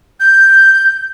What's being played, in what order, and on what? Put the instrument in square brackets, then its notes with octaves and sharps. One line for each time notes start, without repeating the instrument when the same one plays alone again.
[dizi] G6